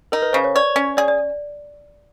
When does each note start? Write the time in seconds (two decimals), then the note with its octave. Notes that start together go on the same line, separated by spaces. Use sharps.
0.12 D#4 A#4
0.22 B4
0.33 C#3 C5
0.44 C#5
0.55 C#5 D5
0.76 C#4
0.97 G#4 D5
1.08 D5